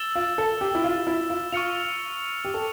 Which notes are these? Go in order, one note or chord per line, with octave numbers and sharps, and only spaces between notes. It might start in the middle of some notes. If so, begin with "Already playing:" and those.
Already playing: E6 A6 E7 G7
F4
A4
G4
E4
F4
E4
F4
F4 C#6 F6 C#7 F7
G4
A4